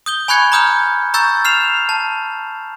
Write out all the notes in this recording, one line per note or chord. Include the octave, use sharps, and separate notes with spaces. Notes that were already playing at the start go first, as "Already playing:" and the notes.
D#6 G6 G7
G#5 B5 C#6 F#6 G#6 C#7
A#5 B5 D#6 F6 G6
A#5 C#6 E6 G6 A6
F6 C7 E7 F7
A5